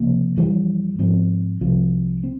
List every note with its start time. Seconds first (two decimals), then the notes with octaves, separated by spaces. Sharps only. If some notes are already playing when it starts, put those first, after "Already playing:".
Already playing: C#2 C3 F3 A#3
0.36 F2 E3 G3
0.99 G#2 F3 C4
1.61 C2 C3 F3
2.23 C4